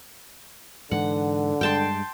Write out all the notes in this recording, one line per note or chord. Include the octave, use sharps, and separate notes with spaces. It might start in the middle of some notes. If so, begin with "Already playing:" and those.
G#2 D3 E3 F#5
G2 G#3 G5 A5 C6